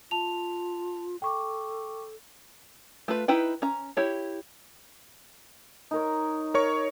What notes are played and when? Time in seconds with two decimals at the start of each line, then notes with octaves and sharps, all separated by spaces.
0.11 F4 A5 F7
1.22 A4 G5 C#6 D6
3.08 A3 F4 B4
3.28 D#4 E4 B4 G5
3.62 C#4 A#5
3.97 E4 G4 C#5
5.91 D#4 A#4 C#5
6.54 A#4 C#5 C#6